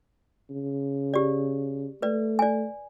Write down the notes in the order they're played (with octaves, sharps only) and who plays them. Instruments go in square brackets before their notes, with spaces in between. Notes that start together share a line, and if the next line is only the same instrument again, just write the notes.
[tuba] C#3
[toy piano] G4 D5
[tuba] A3 [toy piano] B4 D5
[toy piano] D5 G#5